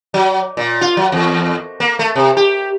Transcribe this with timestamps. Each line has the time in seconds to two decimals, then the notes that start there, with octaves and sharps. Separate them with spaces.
0.14 F#3
0.57 A#2
0.81 F4
0.97 F#3
1.12 E2
1.80 A#3
1.99 A3
2.15 C3
2.37 G4